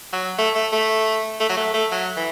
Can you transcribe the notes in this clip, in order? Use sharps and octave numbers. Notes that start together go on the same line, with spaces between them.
F#3
A3
A3
A3
A3
F#3
A3
A3
F#3
E3